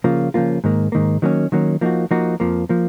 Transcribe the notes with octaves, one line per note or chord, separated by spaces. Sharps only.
C#3 F3 A#3 F4
C#3 F3 A#3 F4
G#2 D#3 A#3
G#2 D#3 A#3
D#3 F#3 A#3 C#4
D#3 F#3 A#3 C#4
F3 A#3 D#4 F#4
F3 A#3 D#4 F#4
F2 F3 A#3
F3 A#3